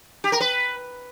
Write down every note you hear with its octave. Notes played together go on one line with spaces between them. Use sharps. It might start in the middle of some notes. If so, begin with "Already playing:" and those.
G4
A#4
B4